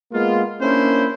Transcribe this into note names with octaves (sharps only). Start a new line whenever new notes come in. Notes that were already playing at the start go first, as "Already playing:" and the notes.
G#3 A#3 B3 F4
A#3 C#4 D4 E4 C5